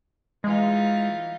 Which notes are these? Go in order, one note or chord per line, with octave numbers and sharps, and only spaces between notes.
E3 G#3 D#4 F4